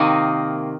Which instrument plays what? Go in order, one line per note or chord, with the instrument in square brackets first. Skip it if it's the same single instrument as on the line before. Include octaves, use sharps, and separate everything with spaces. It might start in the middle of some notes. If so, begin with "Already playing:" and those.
Already playing: [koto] C3 D#3 A#3 D#4